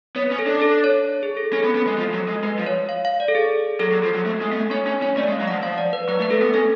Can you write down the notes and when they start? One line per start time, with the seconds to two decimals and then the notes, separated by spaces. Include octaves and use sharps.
0.16 B3 C#5
0.31 C#4
0.39 A4
0.46 D4
0.62 A4
0.84 C#5
1.23 G#4
1.37 A4
1.53 C#4 A4
1.64 B3
1.75 B3
1.87 G#3
1.98 F3
2.14 F#3
2.28 G#3
2.44 G#3 B4
2.59 F3
2.66 C#5
2.89 F5
3.05 F5
3.20 D5
3.28 A4
3.35 G#4
3.80 F#3 A4
3.92 F#3
4.03 F3
4.15 F#3
4.26 A3
4.41 G#3
4.52 B3
4.56 A3
4.71 C#4 C#5
4.87 C#4 C#5
5.02 C#4 C#5
5.17 A3 D5
5.28 G#3
5.32 F5
5.40 F#3
5.47 F3 F#5
5.63 F3 F5
5.78 D5
5.93 B4
6.08 F#3 B4
6.20 A3
6.22 B4
6.31 A3 A4
6.42 B3
6.54 C#4 A4